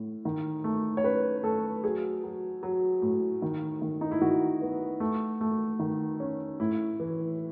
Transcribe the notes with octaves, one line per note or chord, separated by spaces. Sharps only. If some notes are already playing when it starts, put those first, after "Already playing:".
Already playing: A2
D#3
A3
C#5
C#4 B4
A3 A4
F#3 G#4
F#3
F#3
A2
D#3
D#3
D#4
E4
D#3 F#4
B3
A3
A3
D#3
C#4
A2 E4
E3